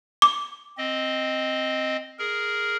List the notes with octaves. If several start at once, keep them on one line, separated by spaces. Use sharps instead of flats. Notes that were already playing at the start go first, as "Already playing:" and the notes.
D6
C4 D#5
G#4 A#4